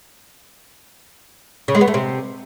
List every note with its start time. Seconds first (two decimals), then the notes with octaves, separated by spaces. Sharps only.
1.68 C#3
1.75 G#3
1.81 B3
1.88 A3
1.94 C3